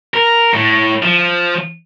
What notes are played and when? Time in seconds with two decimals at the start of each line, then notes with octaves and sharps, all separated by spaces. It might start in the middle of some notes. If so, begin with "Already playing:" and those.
0.14 A#4
0.54 A2
1.03 F3